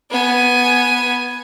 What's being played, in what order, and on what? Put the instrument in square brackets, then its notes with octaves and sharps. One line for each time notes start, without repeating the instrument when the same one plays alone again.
[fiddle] B3 G#5